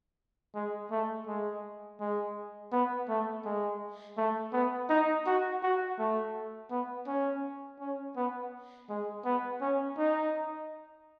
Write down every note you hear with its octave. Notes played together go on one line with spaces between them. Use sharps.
G#3
A3
G#3
G#3
B3
A3
G#3
A3
B3
D#4
F#4
F#4
A3
B3
C#4
C#4
B3
G#3
B3
C#4
D#4